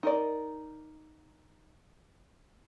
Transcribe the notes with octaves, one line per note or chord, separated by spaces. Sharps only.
D#4 A#4 D5